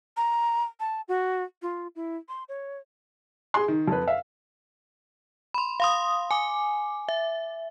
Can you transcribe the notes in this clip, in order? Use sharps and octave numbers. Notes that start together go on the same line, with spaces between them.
A#5
A5
F#4
F4
E4
C6
C#5
G#4 C6
D#3
F2 B4
E5 F5
B5 C6
F5 C6 D#6
G#5 D6
E5